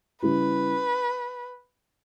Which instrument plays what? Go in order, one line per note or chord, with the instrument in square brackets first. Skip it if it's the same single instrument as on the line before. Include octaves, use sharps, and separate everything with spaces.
[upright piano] C#3 G3 C#4 E4 G4 [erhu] B4